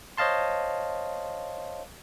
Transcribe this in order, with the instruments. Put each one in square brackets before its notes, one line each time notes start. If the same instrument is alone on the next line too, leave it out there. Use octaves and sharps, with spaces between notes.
[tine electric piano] C5 C#5 D#5 F5 A5 C6